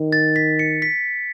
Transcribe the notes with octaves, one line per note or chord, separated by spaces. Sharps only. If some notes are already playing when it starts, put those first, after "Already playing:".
Already playing: D#3
A6
B6
C#7
B6